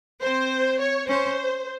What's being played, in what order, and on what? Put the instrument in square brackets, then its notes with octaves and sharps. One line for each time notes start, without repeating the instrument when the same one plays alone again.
[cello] C4 [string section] C5
[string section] C#5
[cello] C#4 [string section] C5